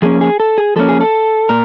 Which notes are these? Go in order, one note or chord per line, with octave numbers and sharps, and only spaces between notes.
F3 A#3 C#4 G#4
G#4
A4
G#4
F3 A#3 C#4 A4
G#4
A4
A#2 A#4